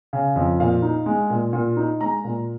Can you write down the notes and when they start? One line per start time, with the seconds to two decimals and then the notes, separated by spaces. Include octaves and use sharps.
0.13 C#3
0.36 F2
0.60 A#2 F5
0.82 D#4
1.06 G#3
1.30 A#2
1.53 A#2
1.77 D#4
2.01 G#3 A#5
2.24 A#2